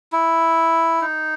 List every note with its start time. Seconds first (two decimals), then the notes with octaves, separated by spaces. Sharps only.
0.13 E4
1.01 D#4